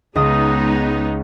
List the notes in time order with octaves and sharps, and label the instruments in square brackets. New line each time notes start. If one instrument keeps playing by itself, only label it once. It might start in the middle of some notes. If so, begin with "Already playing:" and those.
[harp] C#2 D#5 D#6 [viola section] G#3 B3 D#4